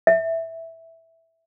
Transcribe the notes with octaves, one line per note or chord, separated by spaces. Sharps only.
E5